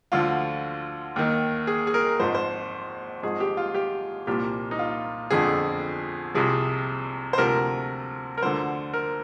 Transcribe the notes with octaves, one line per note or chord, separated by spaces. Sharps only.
D2 D3 F3 F4
D#2 D#3
G#4
G#4
A#4
G#1 G#2 F3 C5
C5
G#1 G#2 F3 G#4
G4
F4
G4
C2 A#2 F3 G4
D#4
F4
G1 F2 D3 F3 G#4
C2 C3 F3 G#4
C5
D2 C3 F3 A#4
A#4
D2 D3 F3 C5
A#4